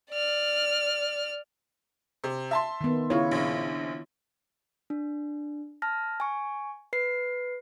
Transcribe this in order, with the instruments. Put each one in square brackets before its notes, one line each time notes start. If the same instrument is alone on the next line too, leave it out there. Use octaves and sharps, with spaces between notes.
[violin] D5 F6
[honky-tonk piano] C3
E5 A5 C6
[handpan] D#3 B3
[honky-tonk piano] C#3 [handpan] E4 F4 C#5
[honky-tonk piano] A#1 C#3
[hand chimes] D4
A5 F6 A#6
G#5 C#6
B4 C7